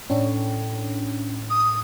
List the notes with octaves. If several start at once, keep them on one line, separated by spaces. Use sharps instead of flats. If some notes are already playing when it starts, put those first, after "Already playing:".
A2 C#4 D4
D#6